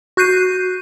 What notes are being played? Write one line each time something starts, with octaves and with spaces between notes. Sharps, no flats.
F#4 F#6 G6 C7 D#7